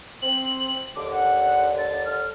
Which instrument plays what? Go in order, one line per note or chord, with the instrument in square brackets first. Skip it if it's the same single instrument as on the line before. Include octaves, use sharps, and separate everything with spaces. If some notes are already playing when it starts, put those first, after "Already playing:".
[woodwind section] C4 [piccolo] F#7
[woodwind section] D#2 D3 [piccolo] D6
[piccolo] F#5
A6
F6